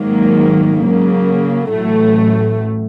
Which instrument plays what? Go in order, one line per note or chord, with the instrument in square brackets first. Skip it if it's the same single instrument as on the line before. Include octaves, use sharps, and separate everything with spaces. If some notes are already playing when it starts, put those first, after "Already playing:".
Already playing: [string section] G#1 G#2 D#3 F#3 A#3
C#3 F#3 A#3
A1 A2 F#3 A3